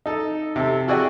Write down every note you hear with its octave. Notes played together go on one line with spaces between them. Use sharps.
D#4 A4
C3 A4
E4 F#4 G#4 D5 D#5 G5